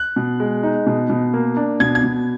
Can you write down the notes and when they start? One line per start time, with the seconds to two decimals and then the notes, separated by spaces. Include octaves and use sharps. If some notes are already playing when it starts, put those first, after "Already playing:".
Already playing: F#6
0.16 B2
0.40 G#3
0.63 D#4
0.87 B2
1.10 B2
1.34 A#3
1.57 D4
1.80 B2 G#6
1.95 G#6
2.03 B2